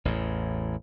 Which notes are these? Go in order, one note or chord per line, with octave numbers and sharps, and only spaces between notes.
A1 E2 A2